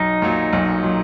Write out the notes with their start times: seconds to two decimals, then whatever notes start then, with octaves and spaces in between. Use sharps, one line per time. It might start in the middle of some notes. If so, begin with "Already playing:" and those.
Already playing: B1 D#4
0.22 A#2 F#3
0.53 B1
0.83 A#2 F#3